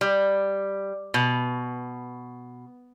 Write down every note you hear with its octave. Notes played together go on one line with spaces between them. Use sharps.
G3
B2